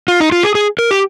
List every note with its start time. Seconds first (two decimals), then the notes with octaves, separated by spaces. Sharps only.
0.08 F4
0.20 D#4
0.32 F4
0.43 G#4
0.55 G#4
0.79 A#4
0.91 G4